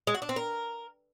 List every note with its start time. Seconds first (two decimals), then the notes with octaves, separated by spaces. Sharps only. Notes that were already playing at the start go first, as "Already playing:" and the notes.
0.07 G#3
0.15 F#4
0.22 D4
0.29 C4
0.36 A#4